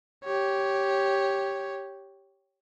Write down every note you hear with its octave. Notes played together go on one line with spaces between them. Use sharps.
G4 C#5